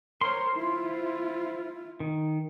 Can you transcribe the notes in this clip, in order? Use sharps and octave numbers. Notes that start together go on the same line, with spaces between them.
A#4 C5 C#5 C6
E4 F4
D#3